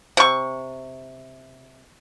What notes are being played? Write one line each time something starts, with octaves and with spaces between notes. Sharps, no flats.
C3 C#6